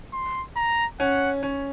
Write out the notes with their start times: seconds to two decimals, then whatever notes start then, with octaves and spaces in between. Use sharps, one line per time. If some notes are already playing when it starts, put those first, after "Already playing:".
0.13 C6
0.56 A#5
1.00 C#4 F#5
1.43 C#4